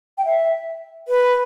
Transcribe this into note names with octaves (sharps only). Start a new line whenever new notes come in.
G5
E5
B4